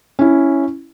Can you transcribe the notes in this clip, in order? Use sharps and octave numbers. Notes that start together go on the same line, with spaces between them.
C#4 E4